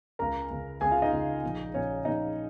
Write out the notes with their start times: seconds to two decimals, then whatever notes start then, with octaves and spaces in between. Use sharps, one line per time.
0.19 C#2 C#3 A#4 A#5
0.51 C#2 C#3
0.81 C#2 C#3 G#4 G#5
0.91 F4 F5
1.02 D#4 D#5
1.12 C#2 C#3
1.43 A#1 A#2
1.74 A#1 A#2 C#4 C#5
2.05 A#1 A#2 D#4 D#5